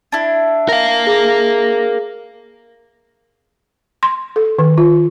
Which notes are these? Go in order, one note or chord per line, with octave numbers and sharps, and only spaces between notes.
D4 E4
A#4 F5
G#4 A#6
C6
A4
D#3
F4